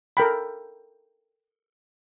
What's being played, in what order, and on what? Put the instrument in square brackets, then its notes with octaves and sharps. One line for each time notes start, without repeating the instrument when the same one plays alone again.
[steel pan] A4 A#4 G5 B5